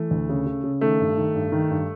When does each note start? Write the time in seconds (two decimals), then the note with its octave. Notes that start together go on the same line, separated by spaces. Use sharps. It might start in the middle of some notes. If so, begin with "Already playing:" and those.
Already playing: E3 A3
0.11 D2
0.29 C#3
0.46 C#3
0.64 C#3
0.81 D#3 A3
1.00 G2
1.17 D#3
1.35 G2
1.52 D#3
1.71 G2